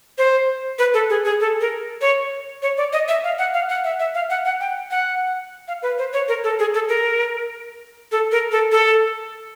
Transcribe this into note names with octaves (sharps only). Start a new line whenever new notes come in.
C5
B4
A4
G#4
G#4
A4
A#4
C#5
C#5
D5
D#5
E5
F5
F#5
F5
F#5
E5
E5
F5
F#5
F#5
G5
F#5
F5
B4
C5
C#5
A#4
A4
G#4
A4
A#4
A4
A#4
A4
A4